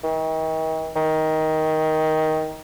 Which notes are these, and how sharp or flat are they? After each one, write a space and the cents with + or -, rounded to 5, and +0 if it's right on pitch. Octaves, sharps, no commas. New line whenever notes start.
D#3 +40
D#3 +15